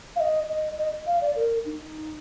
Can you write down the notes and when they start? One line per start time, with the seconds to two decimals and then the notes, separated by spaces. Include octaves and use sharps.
0.16 F5
0.20 D#5
0.49 D#5
0.78 D#5
1.07 F5
1.21 D5
1.36 A#4
1.65 D#4